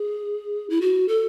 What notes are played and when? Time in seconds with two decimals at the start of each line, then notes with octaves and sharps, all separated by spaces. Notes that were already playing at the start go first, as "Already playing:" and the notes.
Already playing: G#4
0.70 E4
0.81 F#4
1.08 A4